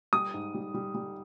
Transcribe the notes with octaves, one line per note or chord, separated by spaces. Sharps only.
G3 D#6
G#2
G3
G3
G3